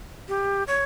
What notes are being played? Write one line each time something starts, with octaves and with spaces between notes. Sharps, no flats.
G4
C#5